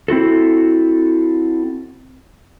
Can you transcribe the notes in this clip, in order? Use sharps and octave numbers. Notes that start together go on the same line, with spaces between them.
C4 E4 F#4 A4